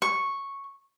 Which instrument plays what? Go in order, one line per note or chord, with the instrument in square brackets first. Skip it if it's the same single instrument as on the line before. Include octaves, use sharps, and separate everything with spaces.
[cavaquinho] C#6